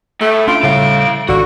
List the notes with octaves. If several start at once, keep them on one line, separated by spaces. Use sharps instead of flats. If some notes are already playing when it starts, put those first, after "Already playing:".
A2 A3 E6
C#4 D4 F4 D7
A2 C#3 G3 A4 F5
G#1 D3 F#4 C#6